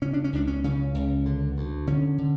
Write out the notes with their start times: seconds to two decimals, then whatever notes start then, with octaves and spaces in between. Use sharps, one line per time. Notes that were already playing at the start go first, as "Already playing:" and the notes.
0.02 C#3 C#4
0.13 D4
0.24 C#4
0.33 C#2 D4
0.47 C#4
0.64 C#3 C#4
0.95 C#2
1.26 D3
1.57 D2
1.87 D3 C#4
2.18 D3